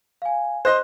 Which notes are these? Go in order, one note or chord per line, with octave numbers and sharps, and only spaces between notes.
F5 G#5
C5 D#5 C6 F#6